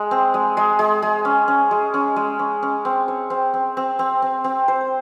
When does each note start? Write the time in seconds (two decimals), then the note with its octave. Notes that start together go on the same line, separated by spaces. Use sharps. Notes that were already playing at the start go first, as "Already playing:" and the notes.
Already playing: G#3
0.11 C4
0.34 G#3
0.57 G#3
0.79 G#3
1.02 G#3
1.25 C#4
1.48 C#4
1.71 G#3
1.94 C#4
2.16 G#3
2.39 C#4
2.63 C#4
2.85 C4
3.08 C#5
3.30 C4
3.54 C4
3.77 C4
3.99 C4
4.22 C4
4.44 C4
4.68 C5